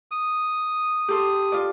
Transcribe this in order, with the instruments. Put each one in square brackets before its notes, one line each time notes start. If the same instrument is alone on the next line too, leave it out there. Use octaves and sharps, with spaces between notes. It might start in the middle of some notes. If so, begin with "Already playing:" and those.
[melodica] D#6
[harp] G4 A4 C6
F4 D5